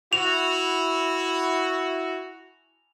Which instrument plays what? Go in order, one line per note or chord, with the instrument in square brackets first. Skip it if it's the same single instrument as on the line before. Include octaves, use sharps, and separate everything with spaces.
[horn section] E4 F#4 [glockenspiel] F7